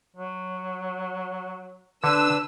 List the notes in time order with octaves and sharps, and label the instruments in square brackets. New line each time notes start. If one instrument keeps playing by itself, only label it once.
[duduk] F#3
[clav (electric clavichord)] D3 [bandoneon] D4 B4 [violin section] E6